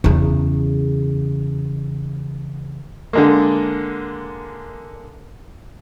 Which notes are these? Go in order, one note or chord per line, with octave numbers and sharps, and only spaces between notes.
E2 C#3
D3 G#3 A#3